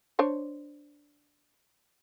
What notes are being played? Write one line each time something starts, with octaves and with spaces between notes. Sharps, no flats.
D4 C5 C#5